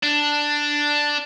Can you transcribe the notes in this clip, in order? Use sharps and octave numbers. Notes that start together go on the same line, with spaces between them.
D4